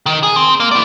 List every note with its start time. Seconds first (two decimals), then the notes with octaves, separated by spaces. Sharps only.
0.06 D#3
0.23 G#4
0.36 C4
0.60 A#3
0.71 E4 D5